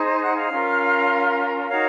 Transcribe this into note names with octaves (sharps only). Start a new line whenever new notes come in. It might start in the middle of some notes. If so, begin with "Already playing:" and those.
Already playing: D#4 G#4 C5
G6
F#5 F#6
F5 F6
C#4 F4 A#4
D#4 F#4 A#4 C#5 F5 F6